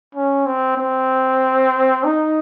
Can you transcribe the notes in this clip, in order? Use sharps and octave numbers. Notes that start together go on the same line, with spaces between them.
C#4
C4
C4
D#4